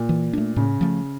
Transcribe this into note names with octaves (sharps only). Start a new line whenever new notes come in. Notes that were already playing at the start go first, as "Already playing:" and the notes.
Already playing: A#2
E3
A3 D4
A2 C#3
F3 A3